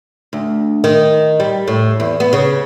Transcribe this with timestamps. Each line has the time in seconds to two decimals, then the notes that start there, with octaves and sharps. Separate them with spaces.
0.33 D2
0.84 D#3
1.40 G3
1.68 A2
2.00 E2
2.20 B3
2.33 C#3